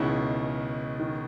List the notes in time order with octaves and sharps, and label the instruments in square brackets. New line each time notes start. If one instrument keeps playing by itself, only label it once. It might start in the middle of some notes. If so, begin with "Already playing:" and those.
Already playing: [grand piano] C#2 B2 G#3 C#4 E4 [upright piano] D#3
[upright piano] D#3